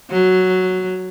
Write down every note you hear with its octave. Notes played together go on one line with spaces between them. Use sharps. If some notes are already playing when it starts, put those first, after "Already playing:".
F#3